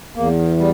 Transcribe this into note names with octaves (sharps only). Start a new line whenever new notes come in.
E2 A#3
G3